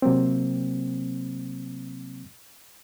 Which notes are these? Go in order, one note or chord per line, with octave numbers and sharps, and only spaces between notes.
C3 F#3 A#3 C4